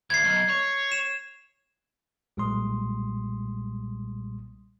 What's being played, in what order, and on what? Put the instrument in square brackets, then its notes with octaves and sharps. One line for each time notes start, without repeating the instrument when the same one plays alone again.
[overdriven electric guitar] D2 [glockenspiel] G#6 C7
[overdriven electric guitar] B1
C#5
[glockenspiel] E7
[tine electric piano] B1 A#2 G3 G#3 C6 D#6